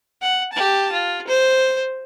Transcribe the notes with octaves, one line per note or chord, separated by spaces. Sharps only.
F#5
G4 A5
F4
C5